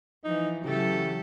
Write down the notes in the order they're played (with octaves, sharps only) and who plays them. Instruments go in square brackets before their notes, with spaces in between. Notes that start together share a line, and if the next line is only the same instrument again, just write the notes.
[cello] E3 F3 [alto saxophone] D#4
[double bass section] C#3 E3 F#3 [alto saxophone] A3 [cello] G4 A4